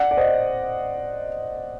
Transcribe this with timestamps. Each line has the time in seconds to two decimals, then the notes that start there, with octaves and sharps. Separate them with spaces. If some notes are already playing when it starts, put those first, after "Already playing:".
Already playing: D5 F#5
0.11 D5
0.17 C5 D#5